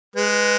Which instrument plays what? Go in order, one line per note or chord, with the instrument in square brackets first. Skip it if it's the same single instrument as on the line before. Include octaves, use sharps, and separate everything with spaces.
[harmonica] G#3 [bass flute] B4